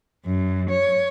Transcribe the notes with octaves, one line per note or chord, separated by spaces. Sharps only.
F#2
C#5